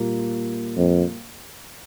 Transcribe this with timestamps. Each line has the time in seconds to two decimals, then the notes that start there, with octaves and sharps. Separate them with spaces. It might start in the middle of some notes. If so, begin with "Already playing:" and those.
Already playing: A#2 G3 A#3
0.77 F2